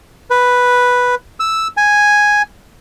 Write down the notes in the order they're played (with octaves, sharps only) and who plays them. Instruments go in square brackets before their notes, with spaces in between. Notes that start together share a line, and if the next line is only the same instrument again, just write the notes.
[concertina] B4
E6
G#5